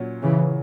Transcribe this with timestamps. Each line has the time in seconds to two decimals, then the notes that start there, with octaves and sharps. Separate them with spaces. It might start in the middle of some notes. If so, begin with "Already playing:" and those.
Already playing: A#2 F#3 C#4
0.22 C#3 E3